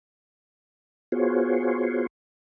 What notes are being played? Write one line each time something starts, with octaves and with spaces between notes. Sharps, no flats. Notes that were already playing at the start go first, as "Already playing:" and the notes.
B3 F4 F#4 G#4 C5 C#5